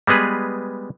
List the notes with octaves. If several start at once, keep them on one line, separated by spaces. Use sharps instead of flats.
G3 G#3 B3 G#4 B4